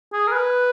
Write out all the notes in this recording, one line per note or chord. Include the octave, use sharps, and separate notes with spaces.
G#4
A#4
B4